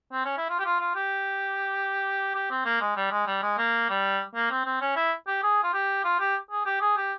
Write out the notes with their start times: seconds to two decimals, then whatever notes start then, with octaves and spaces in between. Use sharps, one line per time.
0.13 C4
0.25 C#4
0.38 E4
0.49 F4
0.59 G4
0.65 F4
0.80 F4
0.96 G4
2.35 G4
2.51 C4
2.65 A#3
2.81 G#3
2.96 G3
3.11 G#3
3.27 G3
3.43 G#3
3.58 A#3
3.89 G3
4.35 A#3
4.51 C4
4.65 C4
4.81 C#4
4.96 E4
5.27 G4
5.43 G#4
5.64 F4
5.73 G4
6.04 F4
6.20 G4
6.51 G#4
6.66 G4
6.81 G#4
6.97 G4